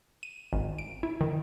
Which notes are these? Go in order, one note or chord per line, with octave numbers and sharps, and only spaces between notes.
D#7
G#1
D7
E4
D#3